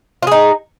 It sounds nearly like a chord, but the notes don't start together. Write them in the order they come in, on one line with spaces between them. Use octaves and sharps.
F4 G#4 D#4